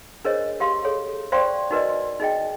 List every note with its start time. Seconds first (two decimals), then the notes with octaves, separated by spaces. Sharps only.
0.25 D4 G#4 A#4 C5 C#5 D#5
0.60 G4 F5 C6
0.84 G#4 A4 C#5
1.32 C5 D5 F5 G5 C6 C#6
1.71 D#4 F#4 A#4 B4 D5 D#5
2.20 D#4 G#4 D#5 G5